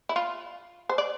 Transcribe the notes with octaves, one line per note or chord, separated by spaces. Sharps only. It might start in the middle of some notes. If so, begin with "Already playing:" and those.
E4
F4
C5
D5